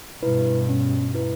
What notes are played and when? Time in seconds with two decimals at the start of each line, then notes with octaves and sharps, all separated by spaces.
0.22 G2 B2 E4 B4
0.69 C#4
1.14 E4 B4